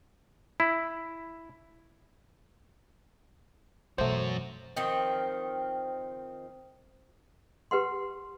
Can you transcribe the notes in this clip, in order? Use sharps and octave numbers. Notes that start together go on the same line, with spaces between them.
E4
F#2 B2 E3 A3 F#4 C5
D#3 F3 C4
G4 B4 F#5 C6